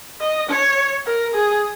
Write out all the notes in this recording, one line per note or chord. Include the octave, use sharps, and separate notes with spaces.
D#5
C#5
A#4
G#4